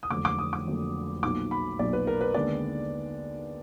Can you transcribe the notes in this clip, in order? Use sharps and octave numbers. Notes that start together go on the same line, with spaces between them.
D#6
F1 F2 D3 F#3 A#3 D6
D6
D#6
D6
F1 F2 D3 F#3 A#3
B1 A#2 F#3 D6
B5
B1 A#2 F#3 D5
B4
A#4
B4
D#2 D3 G#3 B3 D4 D5